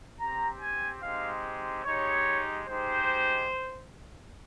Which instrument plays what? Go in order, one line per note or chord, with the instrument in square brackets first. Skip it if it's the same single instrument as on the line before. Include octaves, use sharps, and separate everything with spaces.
[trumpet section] C4 G4 A#5
G#5
G#3 C4 D#4 G4 F5
G#3 D#4 G4 C#5
G#3 D#4 G4 C5